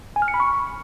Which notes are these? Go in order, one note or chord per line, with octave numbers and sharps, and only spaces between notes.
G#5
F6
C#7
B5
C#6